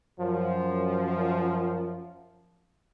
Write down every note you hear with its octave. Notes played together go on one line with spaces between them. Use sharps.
F#2 F3